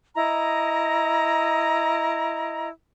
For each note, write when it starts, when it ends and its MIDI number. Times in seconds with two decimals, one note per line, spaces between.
0.15 2.68 64
0.15 2.68 75
0.15 2.68 82